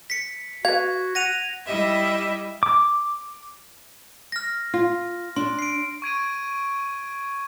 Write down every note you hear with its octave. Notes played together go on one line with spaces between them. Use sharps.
B6 C#7
F#4 B4 F5 G#6
F#5 A#6 D#7 F7
G3 E4 G4 D#5 E5
D6
F6 A#6
F4
D4 C6
C7 D7
C#6 G#6 D7 D#7